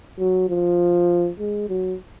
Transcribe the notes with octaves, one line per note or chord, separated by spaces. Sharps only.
F#3
F3
G#3
F#3